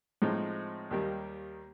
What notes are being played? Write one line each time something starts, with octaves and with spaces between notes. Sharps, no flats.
A2 F3 G#3 C4 D#4
D#2 D#3 G3 A#3